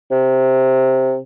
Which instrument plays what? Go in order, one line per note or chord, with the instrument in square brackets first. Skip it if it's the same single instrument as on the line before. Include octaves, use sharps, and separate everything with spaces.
[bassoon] C3